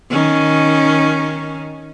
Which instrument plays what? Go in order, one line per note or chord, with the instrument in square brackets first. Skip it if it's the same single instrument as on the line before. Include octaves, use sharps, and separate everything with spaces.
[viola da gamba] D#3 C#4